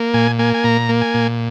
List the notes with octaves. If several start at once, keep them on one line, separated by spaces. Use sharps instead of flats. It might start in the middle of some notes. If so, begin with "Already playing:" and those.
Already playing: A#3
A#2 G#5
A#3 G#5
G#5
A#2 A#5
A#3
G#5
A#2